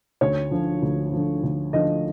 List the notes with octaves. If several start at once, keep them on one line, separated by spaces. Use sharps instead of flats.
D2 C#5
D3 F3
D2
D3 F3
D2
D3 F3 D#5